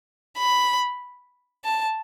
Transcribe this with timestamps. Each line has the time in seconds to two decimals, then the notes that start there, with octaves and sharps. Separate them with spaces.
0.38 B5
1.65 A5